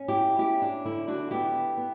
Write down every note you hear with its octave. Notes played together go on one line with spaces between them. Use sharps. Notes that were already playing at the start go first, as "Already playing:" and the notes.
Already playing: C#4
E4 G4
C#4 E4 G4
D4
D3 E4
D4 F#4
B3 E4 G4
B3